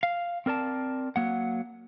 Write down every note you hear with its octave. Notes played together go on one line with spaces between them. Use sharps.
F5
C4 A#4 D5 A5
F#3 A#3 F#5